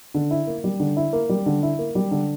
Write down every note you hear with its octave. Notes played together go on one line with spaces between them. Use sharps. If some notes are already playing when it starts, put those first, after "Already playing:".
D3
E4
A#3
G3
D3
E4
A#3
G3
D3
E4
A#3
G3
D3